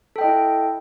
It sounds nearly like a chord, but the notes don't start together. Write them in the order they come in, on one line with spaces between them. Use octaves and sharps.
A4 G5 D#5 E4